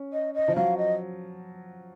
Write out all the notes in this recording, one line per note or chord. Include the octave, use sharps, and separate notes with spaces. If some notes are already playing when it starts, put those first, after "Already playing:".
Already playing: C#4
D#5
D#5
F3
F#3 F5
D#5